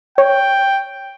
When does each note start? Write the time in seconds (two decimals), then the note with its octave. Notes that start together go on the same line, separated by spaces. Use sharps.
0.18 C#5 G5